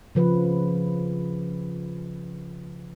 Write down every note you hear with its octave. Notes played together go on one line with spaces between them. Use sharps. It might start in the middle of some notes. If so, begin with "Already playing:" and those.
C#3 F3 B4